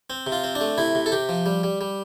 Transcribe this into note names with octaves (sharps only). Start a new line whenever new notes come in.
C4
C3
F4
C4
D4
A3
C3 E4
C3
A4
C3 G4
F3
G3
G3
G3